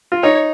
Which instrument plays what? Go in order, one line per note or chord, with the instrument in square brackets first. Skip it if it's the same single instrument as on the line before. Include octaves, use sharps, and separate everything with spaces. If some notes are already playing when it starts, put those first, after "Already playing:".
[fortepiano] F4
[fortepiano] D#4 [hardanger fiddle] C#5